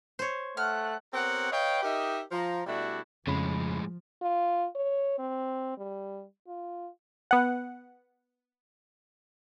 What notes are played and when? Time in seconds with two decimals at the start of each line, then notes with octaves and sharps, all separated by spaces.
0.19 C5 C#5
0.57 A3 F#5 F6 F#6
1.14 B3 C4 G4 A#4 C#5 F#5
1.52 B4 C#5 D#5 F5 G5
1.83 D#4 G4 A#4 D#5 E5
2.31 F3 A#5
2.66 B2 G3 A3 D4 E4 F#4
3.27 F2 A2 C#3 F3 G#3 B5
4.22 F4
4.75 C#5
5.18 C4
5.77 G3
6.47 F4
7.31 B3 F#5